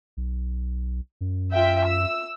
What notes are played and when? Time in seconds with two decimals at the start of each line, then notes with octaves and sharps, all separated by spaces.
0.17 B1
1.21 F#2
1.53 F4 E5 G5
1.87 E6